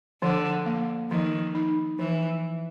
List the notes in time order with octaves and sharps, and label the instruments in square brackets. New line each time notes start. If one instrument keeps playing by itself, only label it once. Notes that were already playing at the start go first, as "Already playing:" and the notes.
[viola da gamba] D3 [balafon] F3
[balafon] A#3
[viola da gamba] D#3 [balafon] F3
[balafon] D#4
[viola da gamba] E3 [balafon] F3